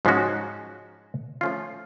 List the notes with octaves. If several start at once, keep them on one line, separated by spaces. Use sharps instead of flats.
G#2 F3 G#3 C#4 F#4
F3 A3 C#4 F4